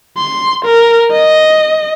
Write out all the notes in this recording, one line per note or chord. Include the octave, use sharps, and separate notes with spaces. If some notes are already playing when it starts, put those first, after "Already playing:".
C6
A#4
D#5